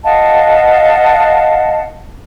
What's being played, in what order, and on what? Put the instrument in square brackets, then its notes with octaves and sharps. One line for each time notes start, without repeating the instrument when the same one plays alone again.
[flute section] D#5 F5 F#5 A5